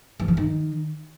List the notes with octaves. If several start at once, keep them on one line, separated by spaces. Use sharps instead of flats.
E3
F3
D#3